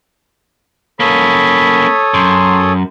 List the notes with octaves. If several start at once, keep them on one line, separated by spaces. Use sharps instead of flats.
A#3 C#4 A4 C#5 B5 D#6
F#2 C6